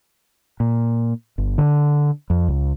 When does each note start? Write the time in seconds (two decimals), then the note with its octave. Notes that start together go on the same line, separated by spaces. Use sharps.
0.60 A#2
1.38 G1
1.58 D3
2.30 F2
2.48 C#2